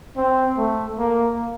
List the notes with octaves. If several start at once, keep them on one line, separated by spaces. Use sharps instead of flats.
C4
A3
A#3